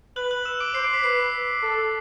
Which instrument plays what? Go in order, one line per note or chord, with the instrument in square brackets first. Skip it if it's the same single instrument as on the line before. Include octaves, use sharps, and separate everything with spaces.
[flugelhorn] B4 [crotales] F#6 F#7
[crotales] F#6 F#7
E6 E7
D6 D7
[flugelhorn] C5 [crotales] C7
[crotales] D6 D7
B6
[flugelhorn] B4 [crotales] C7
[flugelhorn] A4